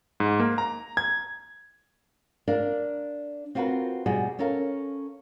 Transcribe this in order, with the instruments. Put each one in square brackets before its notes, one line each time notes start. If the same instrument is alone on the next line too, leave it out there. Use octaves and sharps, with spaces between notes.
[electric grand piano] G#2
A#3
A#5
G#6
[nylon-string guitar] D4 A#4 D5 F5
C4 F4 F#4 A#4 B4
B2 G3 F#4 G#4
C#4 A4 A#4 F5